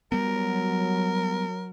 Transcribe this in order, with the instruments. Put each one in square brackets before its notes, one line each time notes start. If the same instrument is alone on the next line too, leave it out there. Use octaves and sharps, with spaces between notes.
[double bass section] F#3 [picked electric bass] G3 B3 [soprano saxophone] A#4